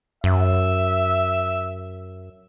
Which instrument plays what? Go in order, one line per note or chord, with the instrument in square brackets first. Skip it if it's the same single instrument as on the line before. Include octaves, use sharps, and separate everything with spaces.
[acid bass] F#2 [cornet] E5